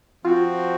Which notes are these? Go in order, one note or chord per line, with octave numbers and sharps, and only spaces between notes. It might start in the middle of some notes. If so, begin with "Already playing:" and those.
F3 C4 F4 F#4